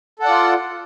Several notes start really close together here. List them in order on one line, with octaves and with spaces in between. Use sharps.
A4 F#5 D5 F4